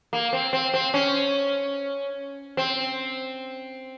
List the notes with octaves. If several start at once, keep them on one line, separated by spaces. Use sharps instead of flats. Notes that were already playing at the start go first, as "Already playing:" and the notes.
A#3
C4
C4
C4
C#4
C4